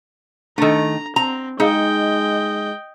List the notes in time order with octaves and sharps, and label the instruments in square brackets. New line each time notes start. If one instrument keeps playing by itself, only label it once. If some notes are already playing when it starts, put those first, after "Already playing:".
[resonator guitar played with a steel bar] D#3 A3 [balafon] D4 A4 [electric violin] A#5
[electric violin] C4 [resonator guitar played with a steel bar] A#5
[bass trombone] G#3 [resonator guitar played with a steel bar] D#4 [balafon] G#4 F5 [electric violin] D#5 G5